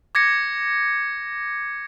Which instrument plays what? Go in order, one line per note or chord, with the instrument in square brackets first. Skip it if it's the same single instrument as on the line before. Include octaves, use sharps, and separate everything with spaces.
[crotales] D6 G#6 A#6 C#7